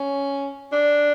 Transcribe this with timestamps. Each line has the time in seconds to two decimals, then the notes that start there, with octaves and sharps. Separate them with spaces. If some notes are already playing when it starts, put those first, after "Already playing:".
Already playing: C#4
0.72 D4